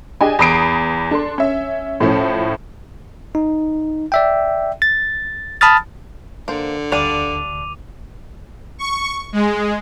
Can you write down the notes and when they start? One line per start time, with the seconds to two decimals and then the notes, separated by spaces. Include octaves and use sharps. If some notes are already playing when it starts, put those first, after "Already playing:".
0.21 D4 G4 G#4 D#5 G5 G#5
0.39 E2 A#5 B5 D#6 C7 D7
1.11 D4 A4 C6
1.38 C#4 E5
2.00 A2 F3 A3 C#4 E4
3.35 D#4
4.12 D5 E5 G5
4.82 A6
5.61 A5 B5 D#6 F6 A6
6.48 D3 A#3 C5
6.92 D2 G3 D4 F5 D6 D#7 F7
8.79 C#6
9.33 G#3